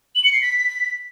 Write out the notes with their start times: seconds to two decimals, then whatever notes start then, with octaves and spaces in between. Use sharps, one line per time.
0.15 F#7
0.24 C#7
0.33 C7
0.42 B6